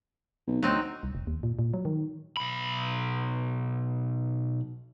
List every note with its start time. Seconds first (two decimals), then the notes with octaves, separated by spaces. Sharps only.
0.48 B1
0.63 D2 F#3 C4 D#4
1.03 C2
1.15 F1
1.27 D#2
1.43 A#2
1.59 A#2
1.74 F#3
1.85 D#3
2.37 B1 B5